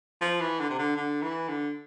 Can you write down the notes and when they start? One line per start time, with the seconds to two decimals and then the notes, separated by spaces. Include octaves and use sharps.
0.21 F3
0.40 E3
0.59 D3
0.70 C3
0.78 D3
0.96 D3
1.22 E3
1.48 D3